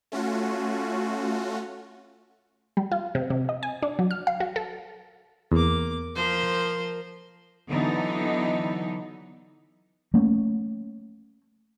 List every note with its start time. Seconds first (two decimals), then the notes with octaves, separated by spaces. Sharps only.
0.12 A3 C#4 F4 F#4
2.77 G3
2.92 F4
3.15 C3
3.30 C3
3.49 D#5
3.63 G#5
3.83 D4
3.99 F#3
4.11 F6
4.27 F5
4.40 F#4
4.56 A4
5.52 E2 A#3 D6
6.16 F3 A#4 C5
7.70 D3 E3 F#3 B3 D#4
10.14 A3 A#3 C#4